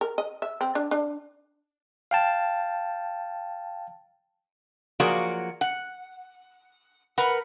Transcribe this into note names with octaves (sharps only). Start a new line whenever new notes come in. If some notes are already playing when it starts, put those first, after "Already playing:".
A#4
D#5
E5
C4
D4
D4
F5 G5 A5
F3 F#3 A#3 F#4 G#4 D5
F#5
A#4 B4 F#5